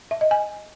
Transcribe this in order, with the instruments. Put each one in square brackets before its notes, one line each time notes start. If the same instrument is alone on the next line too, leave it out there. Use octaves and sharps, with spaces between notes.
[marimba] E5
D#5
G#5